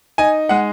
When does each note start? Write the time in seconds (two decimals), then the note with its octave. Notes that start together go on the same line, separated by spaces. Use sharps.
0.18 D#4 G#5
0.49 G#3 F#5